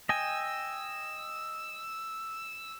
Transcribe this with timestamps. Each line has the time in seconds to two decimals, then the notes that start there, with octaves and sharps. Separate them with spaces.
0.09 D#5 G5 G#5 E6